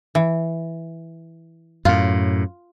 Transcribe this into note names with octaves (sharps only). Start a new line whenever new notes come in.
E3
F#2 A2 F4